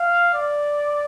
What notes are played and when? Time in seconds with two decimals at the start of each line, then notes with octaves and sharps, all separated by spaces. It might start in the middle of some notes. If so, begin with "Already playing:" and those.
Already playing: F5
0.34 D5